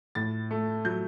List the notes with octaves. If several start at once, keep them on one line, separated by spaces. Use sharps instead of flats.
A2 A6
A3
F#3 G6